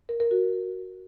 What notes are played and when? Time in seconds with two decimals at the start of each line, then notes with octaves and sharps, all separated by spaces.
0.09 A#4
0.20 A#4
0.31 F#4